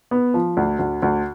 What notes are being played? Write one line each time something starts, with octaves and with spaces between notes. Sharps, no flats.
B3
F3
D2
D2
D2